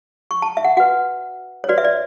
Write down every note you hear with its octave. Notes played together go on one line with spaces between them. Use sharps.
C#6
A5
E5
F#5
F#4 B4 F#5
C#5
F#4 B4 D5
E5
D5